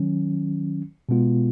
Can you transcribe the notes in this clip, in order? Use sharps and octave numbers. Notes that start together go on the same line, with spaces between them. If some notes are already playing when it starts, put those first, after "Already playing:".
Already playing: D#3 F#3 C#4
B2 G#3 B3 F4